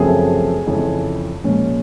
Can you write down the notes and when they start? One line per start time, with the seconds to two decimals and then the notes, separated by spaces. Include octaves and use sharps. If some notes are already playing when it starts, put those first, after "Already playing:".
Already playing: F#2 C#3 F3 A3 C4 G#4
0.67 F2 C#3 E3
1.44 A#2 F3 G#3 C#4